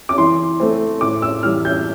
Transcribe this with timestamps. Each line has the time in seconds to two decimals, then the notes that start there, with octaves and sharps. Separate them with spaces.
0.09 D6
0.18 E3 C6
0.60 A3 C4
1.01 A2 D6
1.22 E6
1.43 E3 G3 F6
1.65 G6